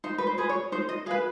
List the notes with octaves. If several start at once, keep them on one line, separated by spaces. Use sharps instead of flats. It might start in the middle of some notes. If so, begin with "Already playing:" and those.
D#4 C5
B4
C5
G#4 B4
C#5
D#4 C5
D#5
G#4 B4 F5